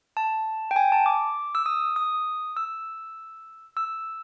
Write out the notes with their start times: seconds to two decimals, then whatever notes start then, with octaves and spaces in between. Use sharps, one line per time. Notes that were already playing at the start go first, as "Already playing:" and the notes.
0.17 A5
0.71 G5
0.76 G#5
0.92 A5
1.06 D6
1.55 E6
1.66 D#6
1.96 D#6
2.57 E6
3.77 E6